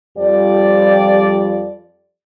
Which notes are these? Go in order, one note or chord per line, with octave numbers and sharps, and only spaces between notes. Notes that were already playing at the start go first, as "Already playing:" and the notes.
F2 F3 G3 G4 D5